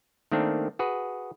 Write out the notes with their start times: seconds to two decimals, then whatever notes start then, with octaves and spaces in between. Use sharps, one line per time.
0.32 D#3 A3 A#3 C4 D4
0.79 F#4 G#4 B4